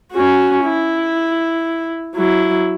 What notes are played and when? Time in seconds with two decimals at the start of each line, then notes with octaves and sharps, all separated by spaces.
0.12 C#4 F#4
0.65 E4
2.15 F#3 E4